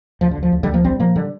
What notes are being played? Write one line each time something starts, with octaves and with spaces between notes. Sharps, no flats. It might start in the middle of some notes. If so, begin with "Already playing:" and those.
D2 F3
D3
D2
F3
D2
D2 D3 G3
F3 A#3
A#1 G3 C4
A#2 F3 A#3
D3 G3